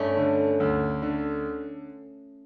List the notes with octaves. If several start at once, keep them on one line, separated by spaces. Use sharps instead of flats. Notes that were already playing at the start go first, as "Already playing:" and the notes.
Already playing: G2 A3 C#4
D3
D2
D3